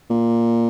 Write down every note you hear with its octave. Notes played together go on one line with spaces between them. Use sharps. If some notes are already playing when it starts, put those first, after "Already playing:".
A#2